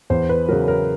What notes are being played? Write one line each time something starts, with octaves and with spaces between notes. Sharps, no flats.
E2 C5
B4
C#3 F#3 A#4
A#4